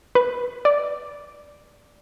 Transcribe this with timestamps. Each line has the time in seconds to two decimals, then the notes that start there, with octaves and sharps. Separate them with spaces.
0.15 B4
0.65 D5